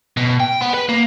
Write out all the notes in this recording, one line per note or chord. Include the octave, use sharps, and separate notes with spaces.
B2
G5
B3
B4
A#3